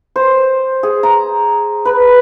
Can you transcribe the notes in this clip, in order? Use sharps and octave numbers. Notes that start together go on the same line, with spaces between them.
C5
G#4
A#5
B4